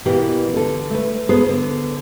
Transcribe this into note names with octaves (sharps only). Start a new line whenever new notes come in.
B2 E3 A#3 G4
D3 A4
A3 B4
B3 G#4 A4 B4 C5
D3